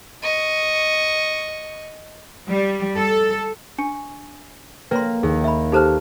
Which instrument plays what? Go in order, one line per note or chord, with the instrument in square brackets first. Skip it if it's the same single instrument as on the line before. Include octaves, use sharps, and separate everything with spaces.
[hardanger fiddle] D#5 C#6
[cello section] G3
A4
[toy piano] D4 [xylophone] G#5 C#6 C#7
[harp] A#3 A#4 [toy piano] B4 C#5 C6 [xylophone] G5
[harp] D#2 [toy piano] G#4
[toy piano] E5 B5
[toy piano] D#4 A4 C5 [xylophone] G4 A5 F6